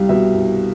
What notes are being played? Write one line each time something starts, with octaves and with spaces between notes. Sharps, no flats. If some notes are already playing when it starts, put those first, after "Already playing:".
Already playing: C2 G3 F5
B2 E5
C2